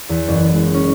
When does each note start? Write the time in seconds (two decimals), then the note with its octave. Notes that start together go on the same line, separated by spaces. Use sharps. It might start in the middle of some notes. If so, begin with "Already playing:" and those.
0.09 E2
0.28 F#1
0.53 G#3
0.74 C#4